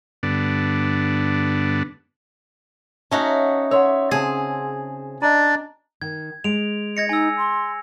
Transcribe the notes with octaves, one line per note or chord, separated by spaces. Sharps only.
G2 D3 B3 D4
C#4 D#4 F#4 E5 F#5 A5
C#5 E5 F#5 C6 E6
C#3 C4 G#4 A5
D4 D5 D#5 A#5
D#3 G#6
G#3 D7 F7
D#5 G#6 A#6 C#7
D#4 G#5 E6
C6